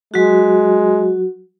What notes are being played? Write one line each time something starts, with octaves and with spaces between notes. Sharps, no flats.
F#3 G#3 F#4